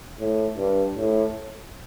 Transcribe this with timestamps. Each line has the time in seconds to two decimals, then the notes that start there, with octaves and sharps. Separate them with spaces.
0.19 A2
0.57 G2
0.96 A2